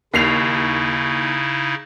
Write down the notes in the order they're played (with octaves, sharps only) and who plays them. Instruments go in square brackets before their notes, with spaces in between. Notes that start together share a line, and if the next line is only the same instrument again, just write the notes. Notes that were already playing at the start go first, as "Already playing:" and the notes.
[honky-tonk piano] D#2 C7 F7 [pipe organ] C#3 D#4 E4